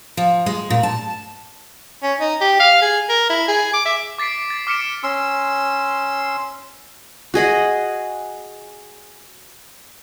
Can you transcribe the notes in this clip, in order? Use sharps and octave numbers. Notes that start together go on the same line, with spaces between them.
F3
G#3
A#2
A5
C#4
D#4
G4
F5
G#4
A#4
E4
G#4
D6
E5
D6 A6 B6 C7 D7
A6
D6 F6 B6 C#7 D7 E7
C#4 C6 E6
F#4 G#4 D#5 F#5